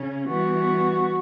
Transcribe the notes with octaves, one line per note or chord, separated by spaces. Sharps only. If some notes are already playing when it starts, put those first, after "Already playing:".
Already playing: C#3 C#4
E3 G3 B3 F#4